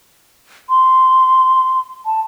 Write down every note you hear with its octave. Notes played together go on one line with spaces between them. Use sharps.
C6
A5